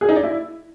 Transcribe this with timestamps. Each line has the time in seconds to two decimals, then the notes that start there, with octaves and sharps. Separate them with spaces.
0.01 G#4
0.09 D#4
0.16 D5
0.23 E4